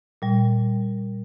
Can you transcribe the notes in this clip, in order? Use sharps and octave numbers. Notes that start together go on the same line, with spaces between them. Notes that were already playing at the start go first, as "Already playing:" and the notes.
A#2 G3